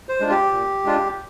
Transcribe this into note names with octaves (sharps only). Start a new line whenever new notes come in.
C5
G#3 D4 F4
G4
A#2
G#3 D4 F4